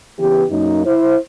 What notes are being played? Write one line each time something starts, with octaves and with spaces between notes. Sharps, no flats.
C#3 E3 B3 G4
F#2 A#3 D#4
E4 C5